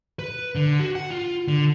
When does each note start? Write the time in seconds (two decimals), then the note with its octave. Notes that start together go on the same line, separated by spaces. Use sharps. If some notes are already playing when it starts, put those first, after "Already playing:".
0.19 B4
0.55 D3
0.80 F#4
0.95 F#5
1.11 F4
1.48 D3